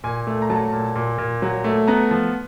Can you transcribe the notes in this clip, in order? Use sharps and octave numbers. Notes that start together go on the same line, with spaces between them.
A#2 G#5
A3
A#5
F#3 A5
A#2
A#2
A#2
F#3
A3
B3 A#5
F3